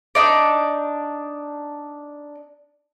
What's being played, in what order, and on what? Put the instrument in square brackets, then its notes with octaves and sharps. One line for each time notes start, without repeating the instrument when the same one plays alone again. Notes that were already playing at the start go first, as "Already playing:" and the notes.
[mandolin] D4 D#4 D5